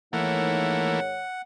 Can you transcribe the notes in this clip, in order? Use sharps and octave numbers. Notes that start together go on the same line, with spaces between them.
G#2 D#3 E3 A3 A#3 C#5 F#5